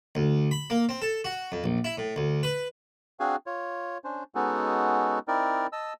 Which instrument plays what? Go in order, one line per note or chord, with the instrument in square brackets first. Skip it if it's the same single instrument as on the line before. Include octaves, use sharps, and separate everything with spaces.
[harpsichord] D2
B5
A#3
C4
A4
F#4
F2
A#1
E4
A2
D2
B4
[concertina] C4 D4 F#4 G#4 F5 G#5
F4 C#5
C#4 D4 C5
G#3 B3 C#4 D#4 F#4 A4
C4 D#4 E4 A#4 D5
D#5 A5 E6